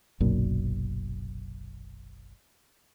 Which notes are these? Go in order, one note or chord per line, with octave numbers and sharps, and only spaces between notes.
F#1 B1 F#2 A#2